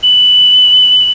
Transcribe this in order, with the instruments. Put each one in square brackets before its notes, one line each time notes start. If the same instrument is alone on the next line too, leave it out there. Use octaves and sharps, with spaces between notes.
[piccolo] F#7